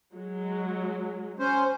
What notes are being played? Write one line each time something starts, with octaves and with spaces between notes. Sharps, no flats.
F#3 G#3
C#4 C5